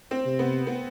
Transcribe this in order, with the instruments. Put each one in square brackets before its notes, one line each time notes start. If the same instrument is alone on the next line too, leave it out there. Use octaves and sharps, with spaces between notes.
[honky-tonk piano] C4
[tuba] C3
[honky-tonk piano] B3
B3